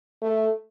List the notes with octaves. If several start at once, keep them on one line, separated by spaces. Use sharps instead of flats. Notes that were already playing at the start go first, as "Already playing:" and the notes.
A3